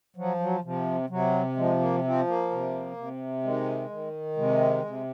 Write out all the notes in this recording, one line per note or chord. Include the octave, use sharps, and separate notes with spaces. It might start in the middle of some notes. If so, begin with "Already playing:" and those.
F3 F#3
F#3
C3 F3
C3 F#3
F3 G#3
A#3
F3 C4
A#3
C3
C3
D#3 G#3
D#3
C3 G#3
C3